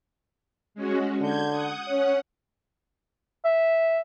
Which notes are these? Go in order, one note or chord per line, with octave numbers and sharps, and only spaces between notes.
G#3 C#4 F#4
D3 G6 G#6
F#5 D#6
C#4 C#5 F#5
E5